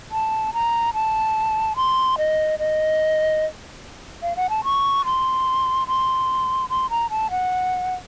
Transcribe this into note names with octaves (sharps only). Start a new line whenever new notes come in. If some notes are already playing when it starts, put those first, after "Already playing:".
A5
A#5
A5
C6
D#5
D#5
F5
F#5
A5
C#6
C6
C6
C6
A#5
A5
F#5